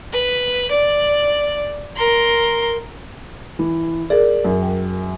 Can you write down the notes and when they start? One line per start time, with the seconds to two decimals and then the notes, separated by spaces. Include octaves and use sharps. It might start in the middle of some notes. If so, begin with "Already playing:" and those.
0.12 B4
0.71 D5
1.97 A#4 C6
3.59 E3
4.10 G#4 A#4 D5
4.44 F#2
4.62 G5